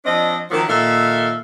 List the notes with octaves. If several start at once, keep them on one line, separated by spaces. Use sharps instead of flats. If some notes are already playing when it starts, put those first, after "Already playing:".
F3 C4 D4 D#5
D#3 F3 F#3 A#3
A#2 D#3 A4 E5 F5